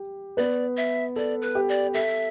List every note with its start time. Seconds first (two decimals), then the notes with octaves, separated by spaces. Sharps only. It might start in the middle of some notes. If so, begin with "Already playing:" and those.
Already playing: G4
0.37 B3 B4 D5
0.77 E5
1.16 A4 D5
1.42 B4
1.55 G4
1.69 D5
1.94 A4 E5